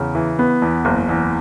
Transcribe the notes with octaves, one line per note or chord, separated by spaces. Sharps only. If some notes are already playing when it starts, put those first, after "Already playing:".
Already playing: E2 C#3
E3
B3
E2
F#1
E2